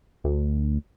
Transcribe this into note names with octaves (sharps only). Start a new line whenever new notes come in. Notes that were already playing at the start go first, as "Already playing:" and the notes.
D2